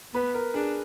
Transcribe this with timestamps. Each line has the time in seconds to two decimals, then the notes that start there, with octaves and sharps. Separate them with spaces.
0.14 B3 B4
0.34 A#4
0.54 D4 G#4